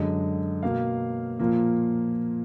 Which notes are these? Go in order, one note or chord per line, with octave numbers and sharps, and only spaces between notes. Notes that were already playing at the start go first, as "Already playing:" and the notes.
Already playing: F#2 D3 G#3 D#5
B2 A#3 F5
A#2 F3 A#3